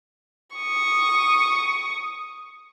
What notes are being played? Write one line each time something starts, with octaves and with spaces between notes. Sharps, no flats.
C#6 D#6